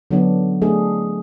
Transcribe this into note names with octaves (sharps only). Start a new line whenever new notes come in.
D3 F#3 B3 D4
A3 D4 G#4